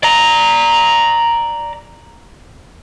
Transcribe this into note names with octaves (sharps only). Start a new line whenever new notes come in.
D5 A#5